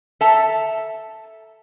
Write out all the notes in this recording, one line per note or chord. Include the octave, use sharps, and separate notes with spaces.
A4 E5 A5 A#5